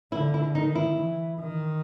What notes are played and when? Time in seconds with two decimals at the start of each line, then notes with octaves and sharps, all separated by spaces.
0.12 D3 E4
0.34 E4
0.55 D#3 D#4
0.75 E4
0.97 E3
1.40 D#3